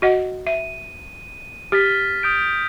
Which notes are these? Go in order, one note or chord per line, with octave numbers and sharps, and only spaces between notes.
F#4 D#5 F#5
E5 D#7
G4 F6 A6 B6
D#6 G6 D7